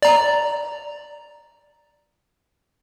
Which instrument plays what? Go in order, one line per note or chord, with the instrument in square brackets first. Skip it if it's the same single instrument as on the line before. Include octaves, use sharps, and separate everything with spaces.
[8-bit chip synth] D5 A#5